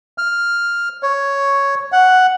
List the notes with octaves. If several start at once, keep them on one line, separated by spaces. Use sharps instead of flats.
F6
C#5
F#5